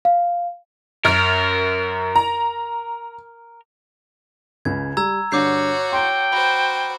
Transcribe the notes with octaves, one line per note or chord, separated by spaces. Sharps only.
F5
F#2 A#4 F6 D7
A#5
C#2 C#3 G#6
G3 A#5 E6 G#6
G2 D3 F#4 C#5 D6 G6 C7
G5 A#5 C6
F#4 C5 B5